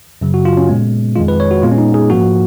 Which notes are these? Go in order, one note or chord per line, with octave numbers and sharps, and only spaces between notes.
F#2 C#3 F#3
F#4
F4
C#4
A#2 G#3 B3
F2 D#3 G#3 F4
B4
C#5
F#4
A#2 G#3 B3 F4
C#4
D#4
G#4
G#2 F3 A#3 F#4